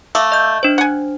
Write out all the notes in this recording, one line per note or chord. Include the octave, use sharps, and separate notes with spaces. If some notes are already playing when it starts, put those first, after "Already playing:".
A3 F5 D6 E6
D#5 G6
D4 C5
F#5 G#5